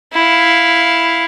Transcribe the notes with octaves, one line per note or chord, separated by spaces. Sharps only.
E4 F5